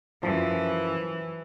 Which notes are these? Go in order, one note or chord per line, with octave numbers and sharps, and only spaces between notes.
F#2 E3 F3